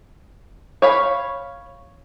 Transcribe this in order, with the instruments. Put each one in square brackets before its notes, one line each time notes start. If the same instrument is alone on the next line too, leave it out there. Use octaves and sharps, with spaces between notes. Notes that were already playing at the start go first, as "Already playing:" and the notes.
[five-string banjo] C#5 F5 B5